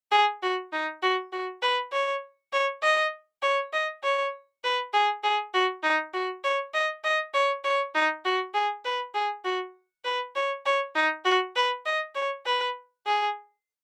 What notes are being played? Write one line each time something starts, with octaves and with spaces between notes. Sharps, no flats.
G#4
F#4
D#4
F#4
F#4
B4
C#5
C#5
D#5
C#5
D#5
C#5
B4
G#4
G#4
F#4
D#4
F#4
C#5
D#5
D#5
C#5
C#5
D#4
F#4
G#4
B4
G#4
F#4
B4
C#5
C#5
D#4
F#4
B4
D#5
C#5
B4
G#4